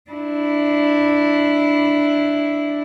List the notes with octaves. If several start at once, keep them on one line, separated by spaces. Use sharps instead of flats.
D4 E4